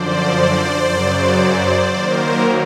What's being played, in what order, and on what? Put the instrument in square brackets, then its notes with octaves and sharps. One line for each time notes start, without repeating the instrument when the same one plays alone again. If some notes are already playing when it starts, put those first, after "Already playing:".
Already playing: [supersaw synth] F#2 D3 F3 C5 D5
F#2 C#3 F#3
D#3 F#3 A#3 A#4 C5